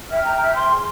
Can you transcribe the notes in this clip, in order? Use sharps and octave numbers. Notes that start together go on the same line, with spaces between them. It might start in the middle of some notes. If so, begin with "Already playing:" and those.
E5 G5 F6
A#5
E5
C6
G#4